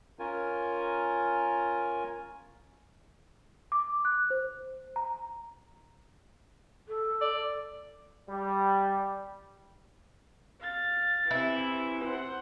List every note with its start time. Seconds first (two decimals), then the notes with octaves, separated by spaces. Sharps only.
0.19 C#4 F4 A#4 G#5
3.72 D6
4.05 F#6
4.30 C5
4.96 A#5
6.88 A4
7.21 D5
8.29 G3
10.62 F5 A6
11.31 C3 E3 E4
12.07 C5 F#5